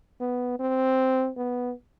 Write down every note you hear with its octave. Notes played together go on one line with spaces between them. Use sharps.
B3
C4
B3